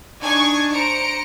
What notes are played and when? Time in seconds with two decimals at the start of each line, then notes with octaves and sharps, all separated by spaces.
0.21 D4 D#4 G#5 C#6 G#6
0.72 C5 A#5 C#7 D7